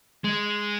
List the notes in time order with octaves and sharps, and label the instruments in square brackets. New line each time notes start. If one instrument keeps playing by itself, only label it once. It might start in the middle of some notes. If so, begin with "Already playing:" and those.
[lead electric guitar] G#3